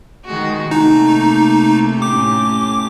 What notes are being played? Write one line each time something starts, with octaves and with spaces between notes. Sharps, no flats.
D#3 G#3 F#4
C3 A3 A#3 D#4
A2 C#4 G4 D6